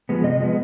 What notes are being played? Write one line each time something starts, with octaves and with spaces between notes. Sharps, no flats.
F3 G#3 B3
C3 D#5
F3 G#3 B3